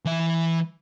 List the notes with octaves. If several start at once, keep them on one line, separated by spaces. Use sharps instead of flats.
E3 E5